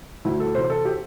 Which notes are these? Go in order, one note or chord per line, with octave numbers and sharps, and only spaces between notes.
D2 E4
A4
C3 E3 C5
A4
G4